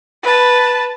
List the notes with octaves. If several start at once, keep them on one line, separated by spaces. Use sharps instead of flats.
B4 A5